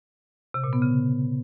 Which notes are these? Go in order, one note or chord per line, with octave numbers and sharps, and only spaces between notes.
C3
A#2
B3
C#3